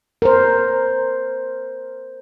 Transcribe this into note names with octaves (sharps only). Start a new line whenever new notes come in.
A#4 C5